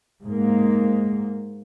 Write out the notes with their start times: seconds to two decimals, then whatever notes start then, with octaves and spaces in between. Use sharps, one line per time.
0.23 G#2 A#3